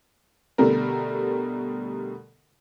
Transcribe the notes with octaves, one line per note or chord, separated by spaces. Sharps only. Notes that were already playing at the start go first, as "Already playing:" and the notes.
B2 D3 G3 A3 A#4